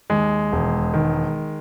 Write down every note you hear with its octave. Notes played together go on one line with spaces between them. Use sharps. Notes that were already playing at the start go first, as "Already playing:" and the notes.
D#2 G#3
E1
D#3